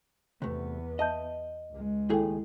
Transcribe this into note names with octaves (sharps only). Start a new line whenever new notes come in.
E2 C3 A3 B3
D#5 E5 A5 G6
C#2 G#3
D#2 A2 E4 G#4 A4 G5